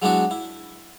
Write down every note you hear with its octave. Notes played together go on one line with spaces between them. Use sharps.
F#3 G#3 B3 D4 E4 F#4
E4